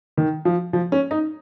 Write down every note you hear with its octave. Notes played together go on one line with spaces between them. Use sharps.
D#3
F3
F3
C#4
D#4